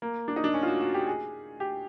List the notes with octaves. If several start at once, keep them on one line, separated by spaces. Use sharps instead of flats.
A#3
D4
D#4
D4
C#4
F4
F#4
F#4
G4
G#4
G4